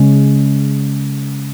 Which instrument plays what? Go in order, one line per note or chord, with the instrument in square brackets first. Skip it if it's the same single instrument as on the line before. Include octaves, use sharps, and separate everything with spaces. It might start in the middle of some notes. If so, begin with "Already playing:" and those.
Already playing: [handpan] C#3 G#3 C#4